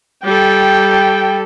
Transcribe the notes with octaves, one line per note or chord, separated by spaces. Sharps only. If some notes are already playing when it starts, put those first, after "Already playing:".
G3 A4 G5